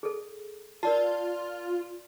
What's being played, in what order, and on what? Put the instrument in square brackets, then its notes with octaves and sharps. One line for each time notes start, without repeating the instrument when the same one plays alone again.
[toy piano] G#4 A4
[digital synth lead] F4 [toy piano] A#4 D5 A5